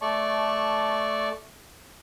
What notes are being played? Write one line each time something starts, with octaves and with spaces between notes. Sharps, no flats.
A3 D5 A5 C#6